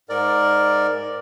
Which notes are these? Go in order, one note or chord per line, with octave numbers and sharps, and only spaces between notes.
G#2 A#4 D5